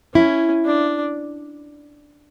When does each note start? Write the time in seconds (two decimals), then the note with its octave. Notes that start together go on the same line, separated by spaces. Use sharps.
0.14 C#4 E4
0.65 D4